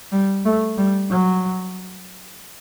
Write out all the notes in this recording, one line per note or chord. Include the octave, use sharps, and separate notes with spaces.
G3
A3
G3
F#3